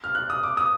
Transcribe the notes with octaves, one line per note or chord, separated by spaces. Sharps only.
F6
F#6
D#6
D6
D#6